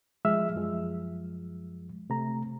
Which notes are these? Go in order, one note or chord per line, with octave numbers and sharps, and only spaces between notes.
F3 G#3 E5 E6 F6
F#2 F3 G#3
C3 A3 A#5